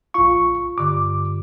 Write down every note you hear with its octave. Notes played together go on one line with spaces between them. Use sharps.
A#1 F4 F5 C#6
G2 D3 D6